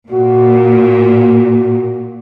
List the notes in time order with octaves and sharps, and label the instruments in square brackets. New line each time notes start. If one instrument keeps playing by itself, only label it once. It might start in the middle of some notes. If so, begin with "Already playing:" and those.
[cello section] A#2 [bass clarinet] F#4